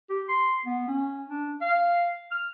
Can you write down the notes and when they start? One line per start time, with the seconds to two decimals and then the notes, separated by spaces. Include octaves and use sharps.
0.10 G4
0.29 C6
0.66 B3
0.88 C#4
1.30 D4
1.62 F5
2.32 F6